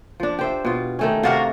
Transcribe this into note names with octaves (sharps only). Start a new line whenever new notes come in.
F3 D4
G4 C5 E5
B2 F4
D#3 A3 C#4
C3 D4 F4 F#4 A#4